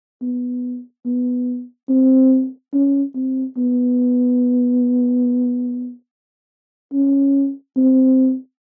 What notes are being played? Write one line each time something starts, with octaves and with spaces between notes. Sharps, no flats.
B3
B3
C4
C#4
C4
B3
C#4
C4